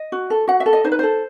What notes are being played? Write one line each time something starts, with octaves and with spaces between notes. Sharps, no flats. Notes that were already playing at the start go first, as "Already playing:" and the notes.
Already playing: D#5
F#4
A4
F#4 F#5
E5
A4
D#5
D#4 C5
B4
A4 C5